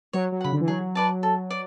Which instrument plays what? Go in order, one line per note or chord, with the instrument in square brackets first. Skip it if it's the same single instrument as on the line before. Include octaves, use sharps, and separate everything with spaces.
[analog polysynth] F#3 [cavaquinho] C#5
[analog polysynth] F#3
[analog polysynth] C#3 [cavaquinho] F#5 B5
[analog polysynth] D3
E3
[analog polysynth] F#3 [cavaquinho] G#4
[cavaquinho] B4 D5 A5
A4
D5